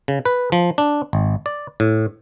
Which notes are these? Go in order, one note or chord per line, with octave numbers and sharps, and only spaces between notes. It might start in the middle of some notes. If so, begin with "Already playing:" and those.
C#3
B4
F3
D4
G#1
D5
A2